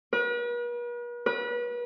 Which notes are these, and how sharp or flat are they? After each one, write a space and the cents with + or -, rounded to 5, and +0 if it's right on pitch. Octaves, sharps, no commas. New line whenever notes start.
B4 -45
B4 -35